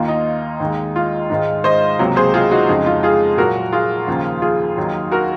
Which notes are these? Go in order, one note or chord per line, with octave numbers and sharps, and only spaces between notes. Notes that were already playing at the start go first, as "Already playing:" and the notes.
Already playing: D#2 D#3 A#3 F4
D#4
D#2 D#3 G#3
F4
G#2 D#3 G#3
C5 D#5
C#2 C3 F#3 A#3
G#4 C5
F4 G#4
D#4 F#4
F2 C#3 G#3 D#4
F4
F4 G#4
A#2 F#3 A#3 F#4 A#4
F4 G#4
D#2 C#3 F3 A#3
F4 G#4
D#2 D#3 F#3
F#4 A#4